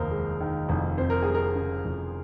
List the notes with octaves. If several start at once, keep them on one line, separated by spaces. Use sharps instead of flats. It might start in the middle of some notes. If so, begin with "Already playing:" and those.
Already playing: F1 D#2 D#3 A#4 C5
G#3
D#3
F1
F2 C5
A#4
G3 G#4
A#4
C#3
F1